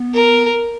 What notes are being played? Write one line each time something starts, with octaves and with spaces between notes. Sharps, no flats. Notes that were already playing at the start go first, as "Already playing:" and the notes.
Already playing: B3
A#4